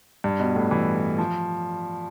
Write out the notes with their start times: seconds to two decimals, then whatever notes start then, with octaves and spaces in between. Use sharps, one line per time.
0.24 G2
0.40 B2
0.56 A2
0.71 E3
1.18 F3